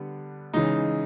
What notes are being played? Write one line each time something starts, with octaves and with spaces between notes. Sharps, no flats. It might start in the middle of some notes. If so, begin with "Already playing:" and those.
Already playing: D3 G3 B3
C#3 E3 G#3 D#4